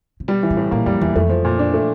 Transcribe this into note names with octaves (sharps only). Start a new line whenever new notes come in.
C3
B2 G3
E3
C3
A2
A#2 A#3
F2 G3
E2 E3
F2 A3
F3
A#2
D4
A3